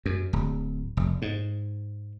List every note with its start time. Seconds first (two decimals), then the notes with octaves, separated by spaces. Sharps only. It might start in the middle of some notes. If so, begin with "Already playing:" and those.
0.06 F#2
0.33 D1
0.97 F1
1.22 G#2